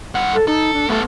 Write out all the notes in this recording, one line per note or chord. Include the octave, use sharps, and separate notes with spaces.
G2 F#5
A4
D#4 A4
D4
A3 B3 A4